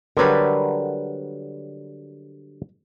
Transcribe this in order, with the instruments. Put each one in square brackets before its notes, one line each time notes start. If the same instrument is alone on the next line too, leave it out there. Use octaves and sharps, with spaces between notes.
[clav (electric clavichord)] D3 F#3 G3 [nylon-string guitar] A#4 B4